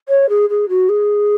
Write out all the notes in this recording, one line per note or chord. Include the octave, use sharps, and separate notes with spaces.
C#5
G#4
G#4
F#4
G#4